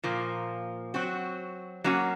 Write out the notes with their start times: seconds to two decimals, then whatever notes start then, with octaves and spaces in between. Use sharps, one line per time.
0.04 A#2 F3 A#3
0.94 F#3 C4 F#4
1.84 F#3 A#3 C#4 F#4